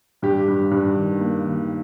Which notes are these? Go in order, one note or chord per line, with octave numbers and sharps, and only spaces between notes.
G2 G4
G2
G2
D#3
A#3
D#3